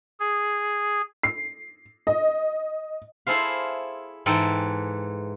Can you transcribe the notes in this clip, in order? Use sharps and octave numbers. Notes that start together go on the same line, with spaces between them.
G#4
C7
D#5
E4 G#4 A4 C5 F5
G#2 E3 A4 G5